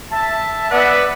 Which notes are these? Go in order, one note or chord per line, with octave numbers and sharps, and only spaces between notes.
E5 A5
B3 B4 D5 E5 F#5